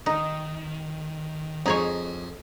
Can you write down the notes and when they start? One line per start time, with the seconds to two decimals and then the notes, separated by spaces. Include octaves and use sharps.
0.06 D#3 D#4
1.66 F2 D#4 G#4 C#5